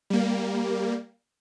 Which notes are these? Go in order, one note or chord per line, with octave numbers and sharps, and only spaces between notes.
G3 A#3